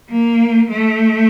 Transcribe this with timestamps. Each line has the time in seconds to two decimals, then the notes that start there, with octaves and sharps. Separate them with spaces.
0.11 A#3
0.71 A3